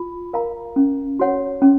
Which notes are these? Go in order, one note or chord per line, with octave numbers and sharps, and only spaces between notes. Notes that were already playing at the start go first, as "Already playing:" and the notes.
Already playing: F4
A#4 F5 A#5
C#4
F#4 C#5 F#5
C#4